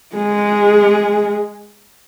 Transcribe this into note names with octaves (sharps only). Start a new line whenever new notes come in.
G#3 G#4